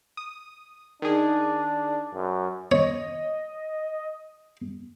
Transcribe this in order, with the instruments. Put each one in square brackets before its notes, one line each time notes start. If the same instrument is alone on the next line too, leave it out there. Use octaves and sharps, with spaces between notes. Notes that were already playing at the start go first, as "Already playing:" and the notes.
[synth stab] D#6
[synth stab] D#3 G#4 [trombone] D4
[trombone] F#2
[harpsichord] C#5 [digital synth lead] D#5